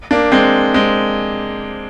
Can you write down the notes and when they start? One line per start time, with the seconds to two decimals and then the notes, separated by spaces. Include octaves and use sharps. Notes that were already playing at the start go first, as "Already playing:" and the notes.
0.11 A#3 D4
0.32 G#3 C4
0.74 G#3 C4